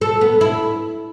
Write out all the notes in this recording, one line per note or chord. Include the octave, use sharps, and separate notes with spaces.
A4
B3
E4